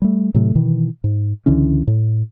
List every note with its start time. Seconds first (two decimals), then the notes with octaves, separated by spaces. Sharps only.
0.02 G3 A3
0.34 A2 C3 F#3 A3
0.55 B2 D#3 E3
1.04 G#2
1.46 C#2 D3 E3 C#4
1.87 A2